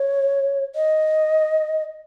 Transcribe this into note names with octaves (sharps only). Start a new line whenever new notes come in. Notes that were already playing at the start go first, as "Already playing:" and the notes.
Already playing: C#5
D#5